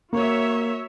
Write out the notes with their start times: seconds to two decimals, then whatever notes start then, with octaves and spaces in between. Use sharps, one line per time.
0.13 A#3 F#4 C#5 E5